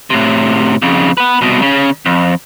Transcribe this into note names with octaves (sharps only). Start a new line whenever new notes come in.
A2 C3
F2 C#3
B3 B4
C2 B2
C#3 C#4
F2